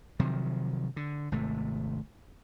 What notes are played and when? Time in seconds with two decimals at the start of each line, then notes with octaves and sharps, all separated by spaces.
0.20 C3 D#3 F3 F#3
0.96 D3
1.32 G#1 C3 A3